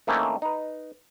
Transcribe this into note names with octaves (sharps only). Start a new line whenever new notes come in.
E3 A3 A#3 C4 C#4 D#4
D#4 B4